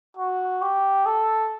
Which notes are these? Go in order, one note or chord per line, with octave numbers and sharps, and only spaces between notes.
F#4
G4
A4